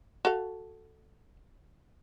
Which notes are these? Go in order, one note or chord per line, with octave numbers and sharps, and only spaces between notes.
F#4 A4 F5